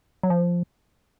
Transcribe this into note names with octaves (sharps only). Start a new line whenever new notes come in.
F#3
F3